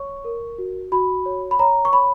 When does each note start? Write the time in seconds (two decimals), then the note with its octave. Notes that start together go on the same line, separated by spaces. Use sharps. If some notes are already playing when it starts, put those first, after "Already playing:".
Already playing: C#5 C#6
0.25 A#4
0.58 F#4
0.92 F#4 B5
1.26 C#5
1.51 B5
1.59 C#5 A#5
1.85 C#6
1.92 C#5 B5